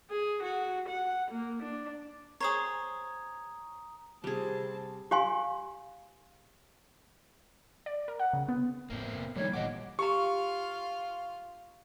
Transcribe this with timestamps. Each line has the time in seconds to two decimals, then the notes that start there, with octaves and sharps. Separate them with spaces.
0.11 G#4
0.43 F#4
0.88 F#5
1.31 A#3
1.62 D4
2.41 G#4 C5 C#5 A#5 D#6
4.24 C3 G3 C4 G#4 A5
5.11 G4 F5 G#5 C6
7.86 D5
8.08 A#4
8.19 F#5
8.33 C#3
8.48 B3
8.90 E1 F2 A2 A#3 C4
9.15 C3 B3
9.36 D#3 F3 G3 A3 A#3 D#4 C#5
9.53 F#1 A#2 D#3 E3 B3 D#5 F#5 D6
9.99 F4 G4 F5 A#5 C#6